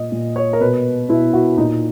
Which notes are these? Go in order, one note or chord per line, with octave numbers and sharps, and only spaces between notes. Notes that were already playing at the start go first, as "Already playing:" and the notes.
Already playing: A#2 D#5
A#2
C#5
A#4
B2 B4
B2 E4
F#4
A#2 D#4